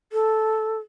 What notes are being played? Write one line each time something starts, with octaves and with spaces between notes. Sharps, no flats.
A4